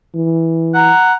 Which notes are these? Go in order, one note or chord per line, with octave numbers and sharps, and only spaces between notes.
E3
F#5 A#5